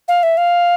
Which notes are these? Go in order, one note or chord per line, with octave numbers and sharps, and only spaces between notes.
F5
E5
F5